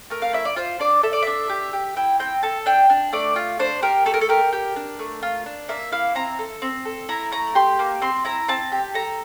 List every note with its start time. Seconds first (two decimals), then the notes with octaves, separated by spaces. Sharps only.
0.10 A3 A#4
0.22 F5
0.33 E4 E5
0.45 D5
0.56 F4 C5
0.79 D4 D5
1.03 A4 E5
1.13 D5
1.23 D4 E5
1.50 G4
1.73 G4
1.96 E4 G5
2.19 C4 G5
2.43 A4 A5
2.66 D4 G5
2.90 D4
3.13 A3 D5
3.36 F4
3.59 D4 C5
3.82 G4 A#4
4.05 A3 A4
4.14 A#4
4.21 A4
4.29 G4 A#4
4.53 G4
4.76 D4
4.99 A3
5.23 F4
5.46 D4
5.69 A#3 E5
5.92 E4 F5
6.15 C4 A#5
6.39 A4
6.62 C4
6.85 A4
7.09 E4 A#5
7.32 A3 A#5
7.55 G4 C6
7.79 A#3
8.02 C4 C6
8.25 E4 A#5
8.48 C4 A5
8.72 G4
8.94 A4 A#5